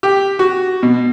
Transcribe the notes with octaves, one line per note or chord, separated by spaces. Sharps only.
G4
F#4
B2